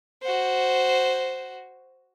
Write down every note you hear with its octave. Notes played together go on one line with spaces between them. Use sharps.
F#4 C5